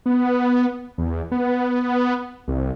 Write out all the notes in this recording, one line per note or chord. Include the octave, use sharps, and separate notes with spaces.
B3
E2
B3
C2